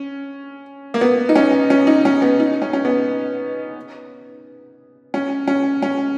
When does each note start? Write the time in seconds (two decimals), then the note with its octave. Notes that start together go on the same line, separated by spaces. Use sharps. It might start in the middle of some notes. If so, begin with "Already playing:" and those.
Already playing: C#4
0.94 A#3
1.01 B3
1.29 D#4
1.36 C#4
1.70 C#4
1.87 D#4
2.05 C#4
2.22 B3
2.40 D#4
2.62 C#4
2.73 C#4
2.85 B3
5.14 C#4
5.48 C#4
5.82 C#4